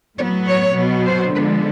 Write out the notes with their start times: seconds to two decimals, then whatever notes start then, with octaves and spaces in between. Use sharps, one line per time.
0.18 A2 F#3 B3 C#5
0.47 C#5
0.76 B2 F#3 B3
1.05 C5
1.34 D3 F3 G#3 B3 B4